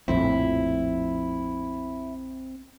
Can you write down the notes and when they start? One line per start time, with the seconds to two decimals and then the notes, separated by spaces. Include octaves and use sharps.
0.08 A#1 F2 A2 C4 E4